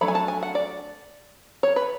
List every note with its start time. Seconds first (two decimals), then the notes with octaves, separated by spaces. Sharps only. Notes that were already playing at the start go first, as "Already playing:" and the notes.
0.01 F#3 A3 D4 B5
0.08 G#5
0.15 A5
0.28 G#5
0.43 F#5
0.55 D5
1.63 C#5
1.76 B4